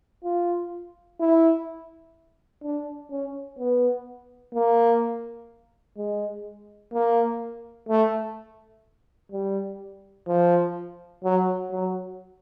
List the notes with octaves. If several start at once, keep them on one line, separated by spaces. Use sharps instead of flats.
F4
E4
D4
C#4
B3
A#3
G#3
A#3
A3
G3
F3
F#3
F#3